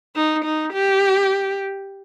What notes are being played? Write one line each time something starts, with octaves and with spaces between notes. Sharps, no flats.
D#4
D#4
G4